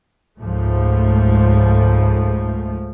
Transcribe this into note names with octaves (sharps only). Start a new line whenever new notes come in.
C#2 G#2 F3 A3